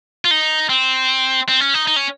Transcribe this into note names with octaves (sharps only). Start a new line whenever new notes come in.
F4
D#4
C4
C4
C#4
D#4
D#4
C#4